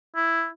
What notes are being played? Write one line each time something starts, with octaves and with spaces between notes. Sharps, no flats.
E4